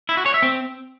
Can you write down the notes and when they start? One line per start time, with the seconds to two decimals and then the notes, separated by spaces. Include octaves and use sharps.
0.09 E4
0.17 F#4
0.26 C#5
0.34 E5
0.42 C4